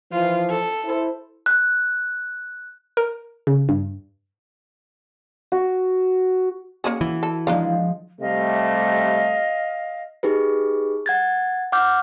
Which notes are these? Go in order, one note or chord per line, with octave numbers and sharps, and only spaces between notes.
E3 F3 F4
A4
E4 C5
F#6
A#4
C#3
G2
F#4
A#3 C#4 F#4 G#4
E3
A4
F3 G#3 D4 D#4 F5
C3 G3 A3 D#5 F5
D#4 G4 G#4 B4
F#5 G#6 A6
F#5 D6 F6 G6